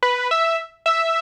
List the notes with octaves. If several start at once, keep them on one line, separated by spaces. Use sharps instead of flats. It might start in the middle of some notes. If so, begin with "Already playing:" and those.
B4
E5
E5